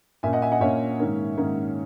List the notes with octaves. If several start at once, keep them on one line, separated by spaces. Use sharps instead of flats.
A#2 A#3 C#4 E5 G#5
D#5 F#5
E5 G#5
D#5 F#5
A#2 A#3 C#4 C#5 E5
G#2 D#3 A#3 C#4
G#2 D#3 A#3 C#4